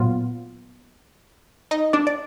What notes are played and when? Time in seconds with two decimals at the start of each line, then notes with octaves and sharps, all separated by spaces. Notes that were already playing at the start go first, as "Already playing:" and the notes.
Already playing: A#2 F#3 B3 F4
1.71 D#4 D#5
1.93 D4 D5
2.07 D5